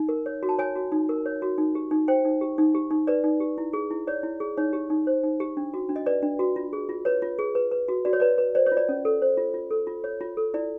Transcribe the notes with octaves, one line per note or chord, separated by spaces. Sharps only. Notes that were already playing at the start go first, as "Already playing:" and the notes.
Already playing: D#4
A#4
C#5
F#4
A5
C#5 G#5
F#4
D#4
A#4
C#5
F#4
D#4
G4
D#4
C5 G5
D#4
G4
D#4
G4
D#4
B4 D5
D#4
G4
E4
G#4
E4
C#5 D5
E4
G#4
D#4 C#5
G4
D#4
C5
D#4
G4
D4
F#4
D4
D#5
B4 D5
D4
F#4
F4
G#4
F4
B4 C#5
F4
G#4
B4
B4
F#4
F#4 D5
C#5
B4 D5
B4
C5 D5
C#5
F4
D5
C#4
A4
C5
F4
F4
A4
F4
C#5
F4
A4
E4 D5